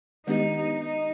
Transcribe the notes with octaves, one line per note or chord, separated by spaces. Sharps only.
D#3 G#3 B3 D4 D#4 G4
D#4